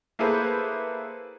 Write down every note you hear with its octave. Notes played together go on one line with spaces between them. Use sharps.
A#3 E4 G#4 A4 B4 C5